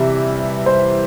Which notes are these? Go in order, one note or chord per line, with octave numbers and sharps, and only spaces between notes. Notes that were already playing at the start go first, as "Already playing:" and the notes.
Already playing: C3 E3 G3 E5
C5